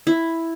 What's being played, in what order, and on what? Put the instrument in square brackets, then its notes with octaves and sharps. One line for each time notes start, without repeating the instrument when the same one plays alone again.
[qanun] E4